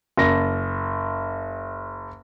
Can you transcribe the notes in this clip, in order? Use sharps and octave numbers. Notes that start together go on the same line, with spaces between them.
F#1 A#6